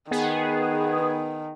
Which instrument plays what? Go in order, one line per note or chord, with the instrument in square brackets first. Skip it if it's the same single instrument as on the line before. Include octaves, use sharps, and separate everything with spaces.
[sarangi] D#3 [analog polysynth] B3 G#4